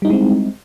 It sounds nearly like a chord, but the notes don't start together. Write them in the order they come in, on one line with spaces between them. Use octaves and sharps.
G3 D#4 E4 G#3 C4